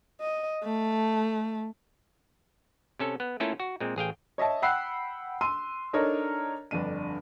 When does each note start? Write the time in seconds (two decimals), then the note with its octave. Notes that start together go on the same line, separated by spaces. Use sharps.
0.21 D#5
0.64 A3
2.99 C3 C#4 A4
3.20 B3
3.40 A3 A#3 C#4 E4 F4 A4
3.60 F#4
3.80 A#2 G#3 C4
3.96 A1 G#4 F5 G5
4.38 C#5 D#5 E5 A5
4.62 F#5 G5 B5 E6 F#6 C7
5.41 C6 E6 D#7
5.93 D4 D#4 A4 A#4 C#5 D#5
6.71 G1 F2 D4 D#7